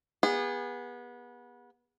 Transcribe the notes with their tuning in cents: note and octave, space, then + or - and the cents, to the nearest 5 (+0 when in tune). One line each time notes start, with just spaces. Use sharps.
B3 -25 G#4 -35